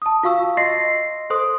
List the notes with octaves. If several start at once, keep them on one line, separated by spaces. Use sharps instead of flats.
A5 D#6
F4 F#4 F5 C#6 E6
D#5 C6 A#6 C7
A4 C5 C6 D#6